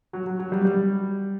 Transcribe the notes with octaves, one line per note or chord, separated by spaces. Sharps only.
F#3
F#3
F#3
G3
G3